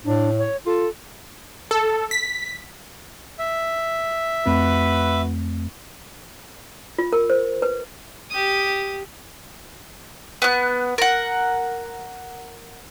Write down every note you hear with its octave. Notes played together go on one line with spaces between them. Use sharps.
A2 D4
C#5
F4 A4
A4
B6
E5
F2 A3 C4 F#4 B4
F4
A#4
C5
B4
G4 D#6
B3 F#6
A#4 F#5